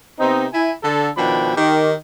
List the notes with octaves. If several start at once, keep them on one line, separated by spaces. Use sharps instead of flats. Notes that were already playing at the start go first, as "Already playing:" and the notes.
C3 B3 C4 D#4
E4 G#5
D3 A4
B2 D#3 F3 D4 G5 B5
D#3 G4